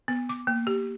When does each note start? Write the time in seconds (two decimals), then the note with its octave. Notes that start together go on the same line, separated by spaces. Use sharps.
0.08 B3
0.29 D6
0.47 A#3
0.67 G4